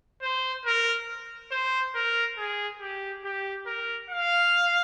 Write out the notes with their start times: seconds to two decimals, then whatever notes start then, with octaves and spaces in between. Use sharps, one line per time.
0.22 C5
0.66 A#4
1.52 C5
1.95 A#4
2.38 G#4
2.81 G4
3.24 G4
3.66 A#4
4.10 F5